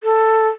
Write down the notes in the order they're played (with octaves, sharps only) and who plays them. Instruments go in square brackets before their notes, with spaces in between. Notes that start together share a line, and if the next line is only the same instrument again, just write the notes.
[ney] A4